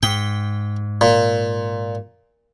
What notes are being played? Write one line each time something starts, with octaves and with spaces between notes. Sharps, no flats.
G#2 G5
A#2